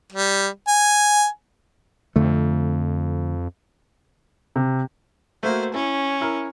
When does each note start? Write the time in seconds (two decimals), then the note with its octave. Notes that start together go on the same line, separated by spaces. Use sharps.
0.12 G3
0.68 G#5
2.16 F2 D3 A3
4.56 C3
5.43 A3 A#3 F#4 C5
5.74 C#4 E4
6.21 E4 A#4